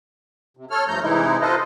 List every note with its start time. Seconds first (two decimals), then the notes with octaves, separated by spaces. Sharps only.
0.57 C3
0.71 A4 C#5 F6
0.88 G2 F3 A3 A#5 G6
1.03 C3 E3 G#3 D#4 E4
1.41 F4 A4 B4 C5 D#5